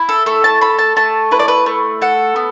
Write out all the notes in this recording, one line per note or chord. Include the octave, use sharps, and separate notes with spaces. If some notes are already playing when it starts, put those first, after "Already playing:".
Already playing: E4
A4
A3 A4
A5
A4 B5
A5
A3 A5
E4 B4
D5
B4
A3
A4 F#5
B3